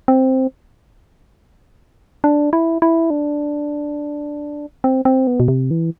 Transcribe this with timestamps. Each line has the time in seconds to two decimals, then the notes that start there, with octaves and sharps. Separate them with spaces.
0.08 C4
2.24 D4
2.53 E4
2.82 E4
3.10 D4
4.84 C4
5.05 C4
5.27 B3
5.40 B2
5.48 C3
5.71 E3